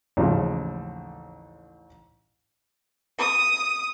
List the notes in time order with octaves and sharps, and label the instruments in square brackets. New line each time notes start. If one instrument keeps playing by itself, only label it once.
[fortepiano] A1 D#2 A2 C#3 F3
[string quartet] D#6